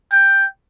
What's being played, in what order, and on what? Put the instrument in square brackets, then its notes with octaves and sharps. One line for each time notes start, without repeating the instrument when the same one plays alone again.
[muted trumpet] G5